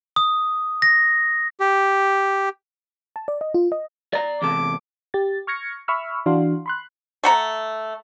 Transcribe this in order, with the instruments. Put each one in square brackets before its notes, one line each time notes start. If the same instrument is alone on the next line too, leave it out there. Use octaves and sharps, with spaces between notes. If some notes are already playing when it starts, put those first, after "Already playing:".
[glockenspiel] D#6
A#6
[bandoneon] G4
[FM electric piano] A5
D5
D#5
F4
D#5
[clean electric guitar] D5 A#5
[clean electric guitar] E2 C3 A4 [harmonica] D6
[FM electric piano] G4 A6
C#6 F6 G#6 A#6 C#7
E5 B5 C#6 E6 F6
E3 D4 F#4 F5 C6
B5 C6 F#6
[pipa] A3 F#5 A#5